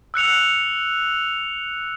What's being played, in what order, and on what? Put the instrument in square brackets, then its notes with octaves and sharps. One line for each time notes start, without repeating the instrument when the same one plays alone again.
[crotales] E6 F#6 C#7 F7